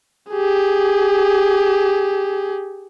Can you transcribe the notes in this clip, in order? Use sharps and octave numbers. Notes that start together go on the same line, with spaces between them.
G4 G#4